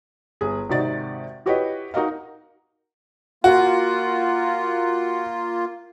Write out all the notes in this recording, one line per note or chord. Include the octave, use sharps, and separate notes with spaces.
G1 G#4
G#1 C3 D#4 F#4 D5 A6
E4 F#4 G4 B4 C#5 D#5
D#4 F#4 A#4 D#5 F5
A#3 F4 F#4